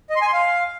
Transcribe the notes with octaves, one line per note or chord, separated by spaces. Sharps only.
D#5
C6
G#5
C6
F5